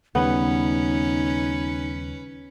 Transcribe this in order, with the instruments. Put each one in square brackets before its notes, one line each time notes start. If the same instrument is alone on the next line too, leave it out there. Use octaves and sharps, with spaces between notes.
[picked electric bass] D#2 C#3 G3 [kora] B3 [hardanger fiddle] C#4 B4 [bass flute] D#4